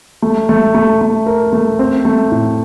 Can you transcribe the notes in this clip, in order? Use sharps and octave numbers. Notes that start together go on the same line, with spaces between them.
A3
A3
A3
A3
A#4
A3
C4
A3
A2